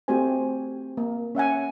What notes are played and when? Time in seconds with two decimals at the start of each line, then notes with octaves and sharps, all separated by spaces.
0.08 A3 C4 F#4 G4 C5 G#5
0.97 A#3
1.35 C#4 E5 F#5 G#5